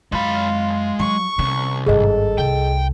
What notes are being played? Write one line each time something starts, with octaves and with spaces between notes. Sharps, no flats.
F#2 G#3 F4 B5
F#3 C#6
C2 C#4
G#1 G2 G#4 A4 D#5
C2 G5